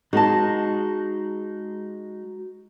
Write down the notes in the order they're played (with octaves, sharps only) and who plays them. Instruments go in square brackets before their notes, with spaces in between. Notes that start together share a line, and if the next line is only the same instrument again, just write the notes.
[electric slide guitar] G#3 D#4 [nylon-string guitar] F#4 A5